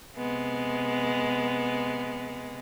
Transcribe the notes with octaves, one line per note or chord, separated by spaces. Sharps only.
C3 G#3 B3